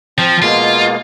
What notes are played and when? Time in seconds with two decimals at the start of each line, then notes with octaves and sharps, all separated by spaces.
0.18 F3 C4
0.42 B2 G#3 A#3 F4